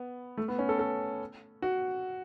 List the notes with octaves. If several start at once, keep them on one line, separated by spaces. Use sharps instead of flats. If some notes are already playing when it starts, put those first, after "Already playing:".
Already playing: B3
A3
B3
C#4
A4
A4
F#4